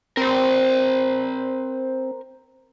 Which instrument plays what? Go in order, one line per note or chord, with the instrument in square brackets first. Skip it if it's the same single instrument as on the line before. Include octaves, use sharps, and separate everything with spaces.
[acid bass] C4 [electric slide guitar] A#4 C5